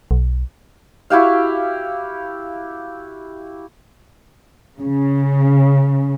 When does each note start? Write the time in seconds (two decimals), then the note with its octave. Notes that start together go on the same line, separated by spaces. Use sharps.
0.11 B1
1.10 E4 F#4 G4 F5
4.80 C#3